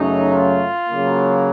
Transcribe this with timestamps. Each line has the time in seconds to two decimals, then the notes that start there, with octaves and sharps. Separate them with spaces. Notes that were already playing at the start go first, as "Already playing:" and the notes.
Already playing: F#2 C#3 F#3 A3 C#4 D#4
0.33 F4
0.86 C#3 F#3 A#3